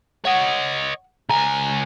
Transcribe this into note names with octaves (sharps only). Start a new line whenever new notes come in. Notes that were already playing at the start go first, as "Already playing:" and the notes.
C#5 D#5 F#5
C#2 G#5 A#5